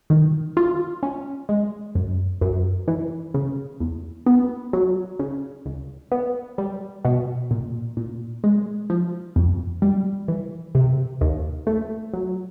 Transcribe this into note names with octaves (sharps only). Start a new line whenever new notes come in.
D#3
F4
C#4
G#3
F#2
F#2
E3
C#3
E2
B3
F#3
C#3
C#2
B3
G3
B2
A#2
A#2
G#3
F3
F2
G3
E3
C3
D#2
A3
F#3